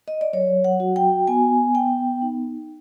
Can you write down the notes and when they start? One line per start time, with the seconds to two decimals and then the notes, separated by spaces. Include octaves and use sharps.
0.08 D#5
0.21 D5
0.33 F#3 C#5
0.64 F#5
0.80 F#4
0.96 G5
1.27 B3 G#5
1.74 B3 G5
2.22 D#4